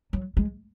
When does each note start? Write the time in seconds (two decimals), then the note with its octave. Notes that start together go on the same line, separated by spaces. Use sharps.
0.13 F#3
0.37 G#3